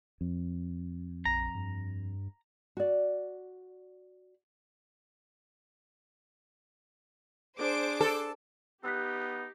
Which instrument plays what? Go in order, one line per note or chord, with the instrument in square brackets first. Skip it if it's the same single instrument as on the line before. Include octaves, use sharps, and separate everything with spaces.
[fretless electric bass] F2
[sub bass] A#1 [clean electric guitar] A#5
[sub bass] G2
[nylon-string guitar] F#4 D5
[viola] D4 G#4 [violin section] C5 D6 D7
[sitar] A4
[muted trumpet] B3 [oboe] D#4 [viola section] G4 [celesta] E6 F#6 B6